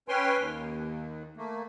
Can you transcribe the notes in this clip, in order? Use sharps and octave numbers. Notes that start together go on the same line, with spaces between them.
C#4 B4 C#5 G5 G#5 C6
D#2
A3 A#3